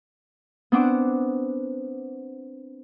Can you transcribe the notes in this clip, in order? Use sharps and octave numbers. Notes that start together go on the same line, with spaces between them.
B3 C4 D4 F#5 D6